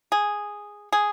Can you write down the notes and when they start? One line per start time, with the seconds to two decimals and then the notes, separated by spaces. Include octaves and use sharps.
0.12 G#4
0.92 G#4